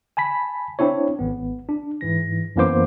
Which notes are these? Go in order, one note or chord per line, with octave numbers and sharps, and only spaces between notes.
G#5 A5 B5 B6
C4 D4 E4 C#5
G#1 B3
D4
G#2 E3 A#6
F#2 E3 A#3 B3 C5 D6